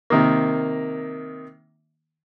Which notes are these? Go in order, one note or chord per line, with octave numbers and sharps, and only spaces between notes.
C3 D#3 A#3